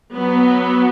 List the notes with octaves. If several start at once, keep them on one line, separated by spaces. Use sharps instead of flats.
F#3 B3